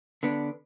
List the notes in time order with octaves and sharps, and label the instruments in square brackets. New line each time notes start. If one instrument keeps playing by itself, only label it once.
[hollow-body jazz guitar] D3 B3 D4